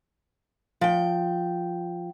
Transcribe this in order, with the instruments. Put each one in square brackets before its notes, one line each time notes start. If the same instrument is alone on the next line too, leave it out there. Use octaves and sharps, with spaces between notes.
[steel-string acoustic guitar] F3 G5